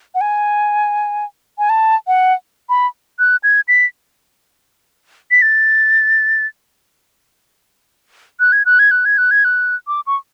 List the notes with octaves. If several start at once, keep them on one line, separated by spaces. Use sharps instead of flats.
F#5
G#5
G#5
A5
F#5
B5
F#6
G#6
B6
B6
A6
F#6
G#6
F#6
G#6
F#6
G#6
F#6
G#6
F#6
D6
C#6